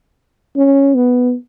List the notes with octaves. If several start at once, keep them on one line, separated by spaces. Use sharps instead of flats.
C#4
B3